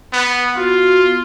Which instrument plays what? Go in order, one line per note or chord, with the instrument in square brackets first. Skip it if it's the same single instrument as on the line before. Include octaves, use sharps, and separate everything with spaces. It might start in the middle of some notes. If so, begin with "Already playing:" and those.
[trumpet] B3
[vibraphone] B3 F#4 [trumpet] F4